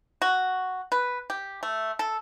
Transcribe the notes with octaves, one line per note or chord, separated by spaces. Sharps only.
F#4
B4
G4
A3
A4